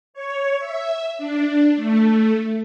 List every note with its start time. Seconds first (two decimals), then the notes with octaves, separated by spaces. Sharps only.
0.14 C#5
0.59 E5
1.18 D4
1.76 A3